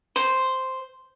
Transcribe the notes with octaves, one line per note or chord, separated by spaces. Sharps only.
C5